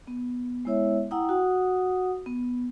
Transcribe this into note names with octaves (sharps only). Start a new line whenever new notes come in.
B3
G#3 B3 E4 C#5 E5
E4 F#5 G5 A#5 D#6
F#4 F#5 D#6
B3